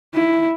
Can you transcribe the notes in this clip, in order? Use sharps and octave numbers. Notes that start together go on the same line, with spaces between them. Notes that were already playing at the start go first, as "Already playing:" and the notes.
E4